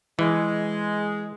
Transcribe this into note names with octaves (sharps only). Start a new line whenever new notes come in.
E3 G#3